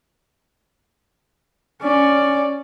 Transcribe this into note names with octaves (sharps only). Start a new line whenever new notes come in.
C#4 D5